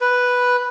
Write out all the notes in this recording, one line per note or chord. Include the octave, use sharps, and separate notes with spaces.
B4